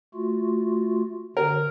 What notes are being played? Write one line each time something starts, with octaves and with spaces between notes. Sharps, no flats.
A3 F4 F#4
D3 A#4